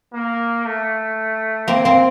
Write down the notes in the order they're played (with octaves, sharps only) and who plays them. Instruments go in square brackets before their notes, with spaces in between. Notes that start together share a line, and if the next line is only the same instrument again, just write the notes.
[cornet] A#3
A3
[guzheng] A#3 C4
A#3 C4